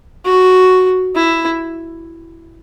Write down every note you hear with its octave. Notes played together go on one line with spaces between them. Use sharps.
F#4
E4